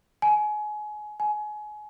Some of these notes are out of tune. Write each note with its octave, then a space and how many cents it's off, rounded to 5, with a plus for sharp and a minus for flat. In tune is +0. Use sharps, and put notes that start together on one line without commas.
G#5 +25
G#5 +25